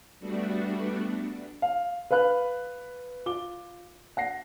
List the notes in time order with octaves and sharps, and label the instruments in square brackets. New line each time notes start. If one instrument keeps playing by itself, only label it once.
[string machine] G3 A3 B3 D4 F#4
[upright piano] F5
B4 F5 B5 F#6
F4 D6 G7
F#5 A#6 C7